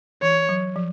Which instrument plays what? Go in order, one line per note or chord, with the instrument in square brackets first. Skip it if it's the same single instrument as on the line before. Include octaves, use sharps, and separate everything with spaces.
[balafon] E3 [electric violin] C#5
[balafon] F#3
F3